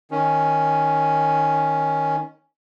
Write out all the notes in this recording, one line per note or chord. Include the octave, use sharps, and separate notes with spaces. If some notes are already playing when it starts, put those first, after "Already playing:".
D#3 C#4